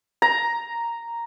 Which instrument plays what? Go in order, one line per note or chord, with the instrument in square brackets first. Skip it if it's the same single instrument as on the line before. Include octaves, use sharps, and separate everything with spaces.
[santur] A#5